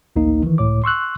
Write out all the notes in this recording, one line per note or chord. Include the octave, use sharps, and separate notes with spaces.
A1 D2 A#3 D#4
D#3 E3
C#2 A2 C#5 D6
C6 C#6 E6 F#6